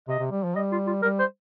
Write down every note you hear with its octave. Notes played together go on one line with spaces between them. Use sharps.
C3 D#5
C3
G3
F3
G3 D#5
F4
F4
G3 A#4
C5